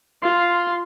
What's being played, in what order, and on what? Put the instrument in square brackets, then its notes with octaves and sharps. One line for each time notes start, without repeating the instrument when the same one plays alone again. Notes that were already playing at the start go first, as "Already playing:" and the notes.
[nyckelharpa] F4 [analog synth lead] C6